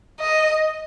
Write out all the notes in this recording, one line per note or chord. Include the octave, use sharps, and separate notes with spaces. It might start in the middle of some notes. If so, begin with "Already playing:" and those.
D#5